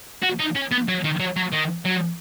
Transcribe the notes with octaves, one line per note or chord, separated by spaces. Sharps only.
F#4
D#4
C#4
B3
F#3
D#3
F#3
F#3
D#3
F#3